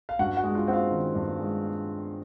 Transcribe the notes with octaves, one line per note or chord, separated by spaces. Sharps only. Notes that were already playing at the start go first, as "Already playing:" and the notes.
F5
G2 F#4 F#5
F#4 F#5
G#3
F4 F5
C4 F#5
F4 F5
D#3
G2
G#3